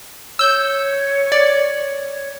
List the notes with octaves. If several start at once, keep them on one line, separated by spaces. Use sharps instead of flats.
C#5 E6 G6
D5